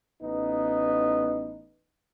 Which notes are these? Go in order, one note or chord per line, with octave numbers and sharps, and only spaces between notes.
A1 B3 D#4